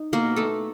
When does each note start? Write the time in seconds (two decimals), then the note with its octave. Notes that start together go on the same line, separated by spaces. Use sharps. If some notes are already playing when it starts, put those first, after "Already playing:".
Already playing: D#4
0.13 B2 A#3 A#4
0.36 A3 A4